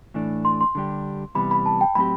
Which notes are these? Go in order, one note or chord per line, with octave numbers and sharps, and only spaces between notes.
A2 E3 A3 D4
C6
C6
D3 G3 D4 G4
C3 E3 G3 B3 B5
B5
A5
G5
A2 F#3 C4 G4 B5